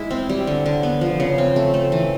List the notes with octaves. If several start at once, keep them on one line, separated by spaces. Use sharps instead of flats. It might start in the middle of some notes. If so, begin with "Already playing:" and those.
Already playing: G#3 E4
C4
G3
D3
D3
B3
F3
C#3
C4
A3
A3
E3